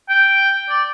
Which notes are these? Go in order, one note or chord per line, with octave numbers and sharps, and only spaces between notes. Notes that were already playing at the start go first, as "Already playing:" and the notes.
G5
D5